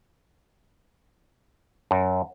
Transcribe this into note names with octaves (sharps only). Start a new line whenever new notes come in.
F#2